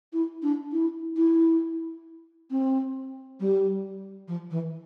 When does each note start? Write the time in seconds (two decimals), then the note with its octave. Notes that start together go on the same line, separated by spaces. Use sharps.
0.13 E4
0.42 D4
0.72 E4
1.17 E4
2.51 C4
3.40 G3
4.28 F3
4.51 E3